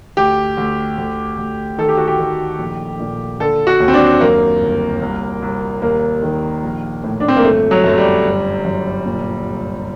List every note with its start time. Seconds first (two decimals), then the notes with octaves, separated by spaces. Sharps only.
0.17 D2 G4
0.57 D2
0.98 D2
1.38 D2
1.78 D#3 A4
1.88 G4
1.98 F#4
2.07 G4
2.19 D#3
2.59 A#1
2.99 A#2
3.40 D3 A4
3.67 F#4
3.80 D#2
3.88 C4
3.94 D4
4.21 F#2 A#3
4.61 G1
5.01 C2
5.42 C2
5.82 D#2 A#3
6.23 D#3
6.63 A#1
7.04 A2
7.20 D4
7.28 C4
7.36 A#3
7.44 G1 A3
7.71 F#3
7.84 F#2 A3
7.98 G3
8.25 G1
8.65 F#2
9.06 A#2
9.46 C2